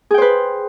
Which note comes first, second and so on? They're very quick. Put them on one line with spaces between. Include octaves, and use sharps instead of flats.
G#4 G5 C5 B4